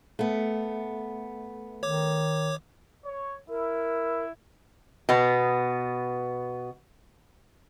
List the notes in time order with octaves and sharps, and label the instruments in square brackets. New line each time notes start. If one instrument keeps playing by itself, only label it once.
[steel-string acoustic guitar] A3 B3
[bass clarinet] D#3 [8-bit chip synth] C#5 D6
[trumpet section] C#5
[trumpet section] E4 [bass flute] A#4
[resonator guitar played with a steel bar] B2 B3